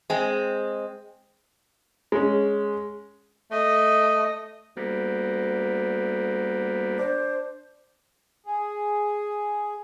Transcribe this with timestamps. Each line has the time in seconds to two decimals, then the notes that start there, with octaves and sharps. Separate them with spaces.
0.10 G#3 C4
2.12 G#3 C#4
3.51 A3 D#5
4.77 D2 G3 A#3 B3
6.99 D4 C5
8.46 G#4